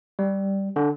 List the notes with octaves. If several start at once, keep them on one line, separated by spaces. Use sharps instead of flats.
G3
D3